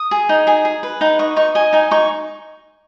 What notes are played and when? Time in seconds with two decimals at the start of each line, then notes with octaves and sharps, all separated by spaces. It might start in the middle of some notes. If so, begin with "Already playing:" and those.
Already playing: D#6
0.11 G#4
0.29 D#4
0.47 G#4 G#5
0.65 G#4
0.83 B4
1.01 D#4 F#5
1.19 D#5 C#6
1.37 D#4 C#6
1.55 D#5 G#5
1.73 D#4 G#5
1.91 D#4 C#6